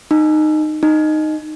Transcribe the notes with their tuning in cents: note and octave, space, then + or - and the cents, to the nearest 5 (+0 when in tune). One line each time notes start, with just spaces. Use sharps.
D#4 -15
D#4 -10